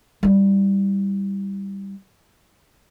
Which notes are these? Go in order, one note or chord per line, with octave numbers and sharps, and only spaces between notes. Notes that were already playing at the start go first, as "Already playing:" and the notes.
G3 E4